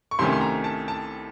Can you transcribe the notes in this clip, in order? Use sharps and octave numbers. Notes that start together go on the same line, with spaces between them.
C#6
C2 C3 D#3 A3 C#4 C6
C6
A#5
A5
A5